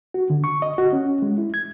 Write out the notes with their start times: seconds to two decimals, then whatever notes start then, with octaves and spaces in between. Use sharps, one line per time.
0.14 F#4
0.30 D3
0.44 C#6
0.62 D#5
0.78 F#4
0.93 C#4
1.22 G#3
1.38 E4
1.54 G#6